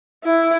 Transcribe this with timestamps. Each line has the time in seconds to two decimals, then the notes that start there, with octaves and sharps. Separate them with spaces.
0.25 E4